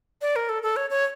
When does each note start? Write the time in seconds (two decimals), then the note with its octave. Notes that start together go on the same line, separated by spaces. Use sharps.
0.22 D5
0.36 A#4
0.49 A4
0.63 A4
0.76 C#5
0.90 C#5